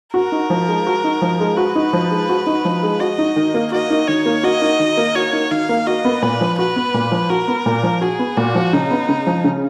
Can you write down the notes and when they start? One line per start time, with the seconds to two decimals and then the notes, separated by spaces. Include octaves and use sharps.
0.14 F#4 A#4
0.32 D#4
0.50 F3
0.68 G#3
0.87 F#4
1.04 D#4
1.22 F3
1.40 G#3
1.57 F#4 B4
1.75 D#4
1.93 F3
2.11 G#3
2.29 F#4
2.47 D#4
2.65 F3
2.83 G#3
3.00 F#4 D#5
3.18 D#4
3.36 D#3
3.54 A#3
3.72 F#4 D#5
3.90 D#4
4.08 D#3 C#5
4.26 A#3
4.43 F#4 D#5
4.62 D#4
4.79 D#3
4.97 A#3
5.15 F#4 C#5
5.33 D#4
5.51 D#3 F5
5.69 A#3
5.87 F#4 D#5
6.05 B3
6.22 A#2 B4
6.41 F3
6.58 F#4 B4
6.76 B3
6.94 A#2
7.12 F3
7.30 F#4 A#4
7.48 B3
7.66 A#2
7.83 F3
8.01 F#4 G#4
8.19 B3
8.37 A#2 F#4
8.55 F3
8.73 C#3 D#4
8.91 B3
9.09 C#3
9.27 F3
9.44 C#3